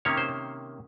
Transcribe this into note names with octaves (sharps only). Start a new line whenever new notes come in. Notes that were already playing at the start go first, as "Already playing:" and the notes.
C3 D#3 A#3 C#4 C#5
C5